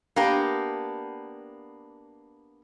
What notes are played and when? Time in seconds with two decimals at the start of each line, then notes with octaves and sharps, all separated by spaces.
0.16 A#3 B3 D4 G4